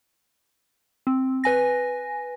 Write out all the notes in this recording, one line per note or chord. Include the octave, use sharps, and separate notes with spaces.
C4
B4 G#5 A#6